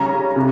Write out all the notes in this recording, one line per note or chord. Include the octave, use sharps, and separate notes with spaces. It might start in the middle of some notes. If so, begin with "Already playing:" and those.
Already playing: C#3 G3 C#4 A#5
C3